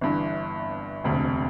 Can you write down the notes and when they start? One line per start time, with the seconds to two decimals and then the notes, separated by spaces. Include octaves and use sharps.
0.01 G1 G2 E3
1.04 E1 D2 C3